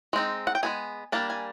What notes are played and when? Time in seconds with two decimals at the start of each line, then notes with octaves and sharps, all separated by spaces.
0.13 G#3 C4 D#4
0.47 F#5
0.55 G5
0.63 G#3 B3 D#4 G#5
1.12 G3 A#3 D4 A5
1.30 G#5